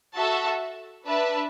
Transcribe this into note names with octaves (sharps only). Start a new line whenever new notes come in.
F#4 A4 E5 A5
D4 B4 E5 A5